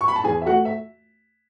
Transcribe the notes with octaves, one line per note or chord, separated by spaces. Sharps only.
C#6
B5
A5
E2 G#4 G#5
E5
A3 F#4 F#5
E5